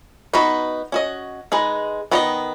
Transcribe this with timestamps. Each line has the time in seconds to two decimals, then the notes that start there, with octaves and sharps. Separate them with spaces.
0.33 B3 D#4 F#4 B4
0.92 C#4 F#4 D#5
1.52 G#3 D#4 G#4 B4 D#5
2.11 D#3 B3 F#4 D#5